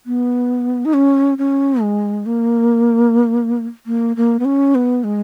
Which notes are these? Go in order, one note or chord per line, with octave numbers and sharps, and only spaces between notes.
B3
D#4
C#4
C#4
G#3
A#3
A#3
A#3
B3
C#4
B3
G#3